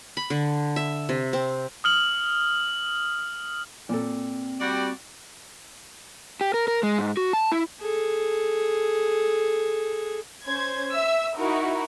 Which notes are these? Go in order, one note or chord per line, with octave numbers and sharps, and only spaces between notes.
B5
D3
E5
C3
C4
D#6 F6 F#7
A#2 C4 A4
G3 F#4 D5
G4
A#4
A#4
G#3
G#2
F#4
A5
E4
G#4 A4
C#4 C5 G#6
E5 E6
D#4 E4 F#4 A#4